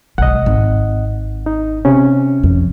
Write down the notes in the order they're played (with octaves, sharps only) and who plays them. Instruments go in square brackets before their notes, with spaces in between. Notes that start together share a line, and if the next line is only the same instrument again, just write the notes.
[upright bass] B1 G#3 [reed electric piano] D#5 F#5
[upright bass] G#1
[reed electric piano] D#4
C3 C#4
[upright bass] F2